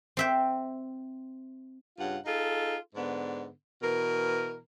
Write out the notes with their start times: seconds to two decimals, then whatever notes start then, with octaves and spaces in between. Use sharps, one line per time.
0.17 C4 E5 G5
1.98 G2 C#3 F4 F#5
2.25 D#4 F4 G#4 A4
2.95 G#2 D3 B3 D4
3.80 B2 E3 A#4